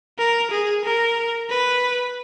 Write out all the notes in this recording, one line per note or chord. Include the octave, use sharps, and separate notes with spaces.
A#4
G#4
A#4
B4